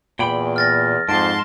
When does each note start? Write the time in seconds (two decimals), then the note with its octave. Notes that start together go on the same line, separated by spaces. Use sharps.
0.19 E2 A#2 G5 B5
0.56 F6 A6 A#6
1.09 F2 G#2 A5 C6 D7